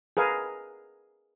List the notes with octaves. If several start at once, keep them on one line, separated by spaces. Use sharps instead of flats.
G#4 A#4 B4 F5